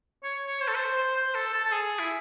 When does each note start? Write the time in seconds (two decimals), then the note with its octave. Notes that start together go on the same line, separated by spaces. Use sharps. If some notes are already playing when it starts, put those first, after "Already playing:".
0.24 C#5
0.46 C#5
0.61 C5
0.68 A4
0.75 C5
0.97 C5
1.16 C5
1.35 A4
1.53 A4
1.65 A4
1.72 G#4
1.99 E4